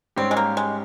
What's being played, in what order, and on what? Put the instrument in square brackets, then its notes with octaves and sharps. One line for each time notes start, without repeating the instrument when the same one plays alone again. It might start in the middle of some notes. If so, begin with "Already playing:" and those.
[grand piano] G#2 G3 C#4 G4 [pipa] C4
[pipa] G#3
A#3
G#3